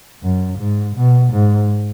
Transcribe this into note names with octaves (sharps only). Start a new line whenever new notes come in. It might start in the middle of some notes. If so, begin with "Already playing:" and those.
F#2
G#2
B2
G#2